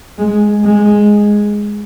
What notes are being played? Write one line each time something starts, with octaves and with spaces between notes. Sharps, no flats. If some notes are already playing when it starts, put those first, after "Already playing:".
G#3
G#3